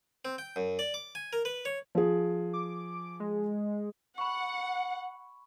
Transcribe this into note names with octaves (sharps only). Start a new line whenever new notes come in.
C4
G5
F#2
D5
D6
G#5
A#4
B4
C#5
F3 G#4
D6
G#3
F#5 B5 C#6